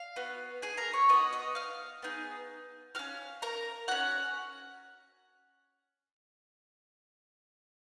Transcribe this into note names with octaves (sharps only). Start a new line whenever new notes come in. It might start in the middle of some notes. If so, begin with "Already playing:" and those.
Already playing: F5
B3 F#4
G#4 G#5
A#4 A#5
C#5 C#6
B3 F#4 D#5 D#6
D#5 D#6
F5 F6
B3 D#4 G#4
C#4 F#4 F5 F6
A#4 A#5
C#4 F#4 F#5 F#6